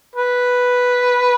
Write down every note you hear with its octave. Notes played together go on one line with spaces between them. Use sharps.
B4